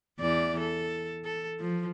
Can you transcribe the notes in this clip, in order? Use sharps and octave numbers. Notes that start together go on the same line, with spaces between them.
E2 E3 D5
A4
A4
F3